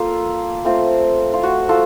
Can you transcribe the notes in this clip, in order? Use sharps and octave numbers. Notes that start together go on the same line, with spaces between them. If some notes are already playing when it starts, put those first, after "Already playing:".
Already playing: A#3 F4 A4
A3 C4 F4
F4
F#4
F4 A4